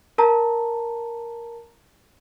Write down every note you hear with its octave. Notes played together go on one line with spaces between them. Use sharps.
A#4 A5 A#5